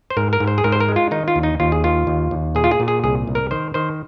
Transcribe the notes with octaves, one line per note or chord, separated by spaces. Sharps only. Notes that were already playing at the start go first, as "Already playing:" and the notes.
C5
G#2 A#4
A#4
G#2
C5
G#4
G#2 A#4
C5
A#4
G#3
F4
D#3 D#4
F4
D#2
D#4
D#2 F4
G#4
D#3 F4
D#2
D#2
A#2 G#4
F4
G#4
A#2
G#4
C2 G#4
C2
A#4
D#3 C5
D#3 C5